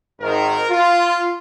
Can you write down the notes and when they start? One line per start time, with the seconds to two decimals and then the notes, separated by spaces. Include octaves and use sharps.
0.19 G#1 G#2 D#3 A#4
0.70 F4